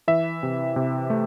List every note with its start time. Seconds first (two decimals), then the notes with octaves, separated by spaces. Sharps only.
0.08 E3 E5
0.43 C3
0.76 C3
1.10 A3